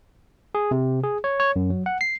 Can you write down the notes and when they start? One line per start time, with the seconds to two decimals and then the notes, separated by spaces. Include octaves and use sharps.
0.55 G#4
0.71 C3
1.03 G#4
1.24 C#5
1.40 C#5
1.56 F#2
1.70 F#3
1.86 F#5
2.01 C7